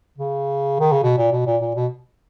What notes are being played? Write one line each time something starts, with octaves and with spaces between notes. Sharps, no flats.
C#3
D#3
C#3
B2
A#2
B2
A#2
A#2
B2